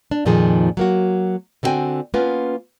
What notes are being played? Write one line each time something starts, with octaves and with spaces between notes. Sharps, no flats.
D4
F2 A#2 D#3 F3 D#4 G#4
F#3 A#3 F#4
D3 C4 E4 F#4 G5 G#5
A#3 B3 C#4 F4 B4